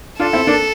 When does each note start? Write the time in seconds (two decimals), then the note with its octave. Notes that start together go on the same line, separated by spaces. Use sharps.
0.19 D4 F4 A4
0.33 C4 E4
0.47 A#3 D4